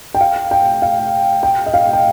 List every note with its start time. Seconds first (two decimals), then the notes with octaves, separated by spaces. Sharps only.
0.15 G5
0.21 F5
0.51 G5
0.82 F5
1.43 G5
1.66 D#5
1.74 F5
1.93 G5